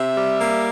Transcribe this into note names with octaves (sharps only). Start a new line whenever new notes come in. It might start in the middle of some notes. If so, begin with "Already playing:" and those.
Already playing: C3 E5
G3
A#3